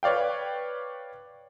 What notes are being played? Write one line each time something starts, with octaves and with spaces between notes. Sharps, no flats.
B4 C#5 D5 F5 G5